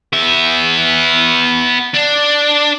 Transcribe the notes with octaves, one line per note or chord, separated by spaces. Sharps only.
B3 E5
D4